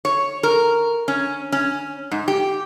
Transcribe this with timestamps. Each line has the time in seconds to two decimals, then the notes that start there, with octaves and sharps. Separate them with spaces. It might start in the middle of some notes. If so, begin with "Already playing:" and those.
0.05 C#5
0.43 A#4
1.08 C#4
1.52 C#4
2.11 G#2
2.28 G4